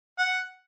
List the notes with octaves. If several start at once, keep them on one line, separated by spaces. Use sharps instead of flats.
F#5